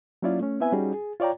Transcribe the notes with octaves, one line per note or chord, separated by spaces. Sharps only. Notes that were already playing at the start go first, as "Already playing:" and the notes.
F#3 A#3 C#4 E4 F4 D5
A3 C#4
B3 C4 E4 B4 E5 G#5
G3 C#4 D#4 F#4 G#4
G#4
F4 C#5 D5 G5 A#5